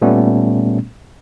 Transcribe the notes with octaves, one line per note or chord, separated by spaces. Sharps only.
A#2 G3 A3 B3 C#4